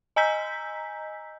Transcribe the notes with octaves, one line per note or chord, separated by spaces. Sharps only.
D#5 G#5 A#5 E6 G6 B6